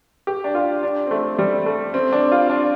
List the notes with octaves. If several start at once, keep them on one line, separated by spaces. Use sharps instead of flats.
G4
D4
F4
D4
C4
A3
G3
A3
C4
D4
F4
D4